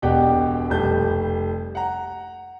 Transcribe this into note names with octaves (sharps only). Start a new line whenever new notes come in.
E1 B2 G4 D5 F#5 G5
F1 G3 A5 G6
F#5 A#5